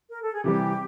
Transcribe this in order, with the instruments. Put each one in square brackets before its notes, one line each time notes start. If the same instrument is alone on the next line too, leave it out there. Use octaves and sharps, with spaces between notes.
[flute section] A#4
A4
G#4
[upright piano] C3 E3 G3 [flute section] G4